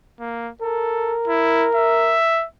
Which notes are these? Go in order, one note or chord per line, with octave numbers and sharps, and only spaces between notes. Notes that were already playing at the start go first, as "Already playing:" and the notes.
A#3
A4 A#4
E4
E5